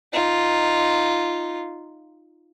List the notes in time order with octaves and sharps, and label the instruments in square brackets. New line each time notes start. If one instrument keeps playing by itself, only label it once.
[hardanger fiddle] D#4 F4